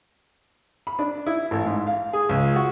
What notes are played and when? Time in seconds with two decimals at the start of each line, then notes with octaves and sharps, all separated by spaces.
0.87 B5
0.99 D4
1.26 E4
1.51 A1
1.66 G#2
1.87 F5
2.13 G#4
2.29 C#2
2.56 F#4